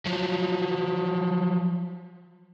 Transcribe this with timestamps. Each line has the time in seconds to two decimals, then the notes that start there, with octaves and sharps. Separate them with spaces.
0.06 F3 F#3